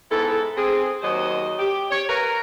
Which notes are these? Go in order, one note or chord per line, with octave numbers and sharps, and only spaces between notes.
G#2 B3 E4 A4
C4 G#4
D#2 F#3 C5 D#5
G4
C#5
A#4 B4